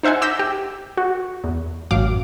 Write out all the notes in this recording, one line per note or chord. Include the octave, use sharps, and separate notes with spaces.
D#4 C5 E5 F#5 G#5
D6 E6 G6 A#6 B6
G4
F#4
E2
A1 F#2 F5 D6